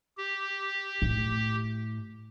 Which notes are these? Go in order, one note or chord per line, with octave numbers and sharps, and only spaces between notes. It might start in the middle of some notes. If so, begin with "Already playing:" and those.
G4
A2